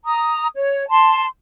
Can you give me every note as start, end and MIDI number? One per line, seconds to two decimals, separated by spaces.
0.05 0.47 82
0.05 0.47 87
0.55 0.88 73
0.89 1.25 81
0.89 1.25 84